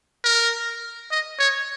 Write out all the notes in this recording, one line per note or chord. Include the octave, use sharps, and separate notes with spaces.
A#4
D#5
C#5